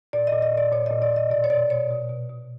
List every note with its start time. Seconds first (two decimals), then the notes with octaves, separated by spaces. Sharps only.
0.13 A#2 D5
0.27 A#2 D#5
0.42 D#5
0.52 A#2
0.58 D5
0.72 A#2 C#5
0.86 A#2 D#5
1.02 D5
1.11 A#2
1.16 D#5
1.30 B2 D5
1.44 C#5
1.50 B2 D5
1.70 B2 C#5
1.90 B2
2.09 B2
2.29 B2